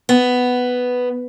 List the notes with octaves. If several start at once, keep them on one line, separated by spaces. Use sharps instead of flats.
B3